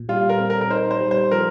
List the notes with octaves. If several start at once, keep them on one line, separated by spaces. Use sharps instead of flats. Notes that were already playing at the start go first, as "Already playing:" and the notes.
Already playing: A#2
G3 F4
A#4
C4
A#4
A#4
D#4 C5
C5
G3
C5
F3 A#4